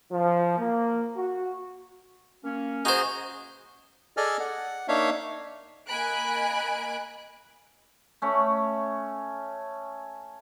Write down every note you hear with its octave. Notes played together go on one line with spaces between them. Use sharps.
F3
A#3
F#4
A#3 C#4
D#4 F#4 G#4 C5
G#4 A4 D5 D#5 G#5 F6
F#5
A#3 D4 D#4 C#5 E5 F5
A#3 D#5 G#5 B5 F#6 D7
A3 C#4